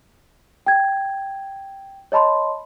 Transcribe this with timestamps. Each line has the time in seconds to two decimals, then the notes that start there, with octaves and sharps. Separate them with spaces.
0.66 G5 G#6
2.12 C#5 D#5 A5 B5 C6